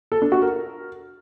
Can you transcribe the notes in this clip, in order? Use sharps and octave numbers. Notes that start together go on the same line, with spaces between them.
A4
D4
F#4
A#4